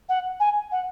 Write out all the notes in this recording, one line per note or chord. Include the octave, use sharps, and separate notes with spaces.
F#5
G#5
F#5